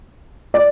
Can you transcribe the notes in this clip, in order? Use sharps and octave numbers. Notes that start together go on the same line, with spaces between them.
D5